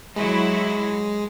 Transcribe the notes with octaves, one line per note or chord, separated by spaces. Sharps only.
F#3 G#3 E4 F#4